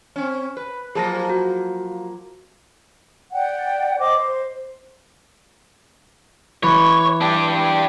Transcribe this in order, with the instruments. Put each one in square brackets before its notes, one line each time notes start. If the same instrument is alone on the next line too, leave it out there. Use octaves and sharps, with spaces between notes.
[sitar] C4 C#4
B4
[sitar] F3 F#3 A#3 [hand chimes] G#4 A5 A#6
[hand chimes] F#4
[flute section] D5 F#5 G5
C5 D#5 D6
C5
[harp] E3 [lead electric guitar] C#5
[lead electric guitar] D4 G4